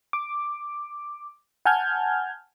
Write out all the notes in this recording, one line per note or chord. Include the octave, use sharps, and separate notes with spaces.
D6
F#5 G#5 A5 F6 G6 G#6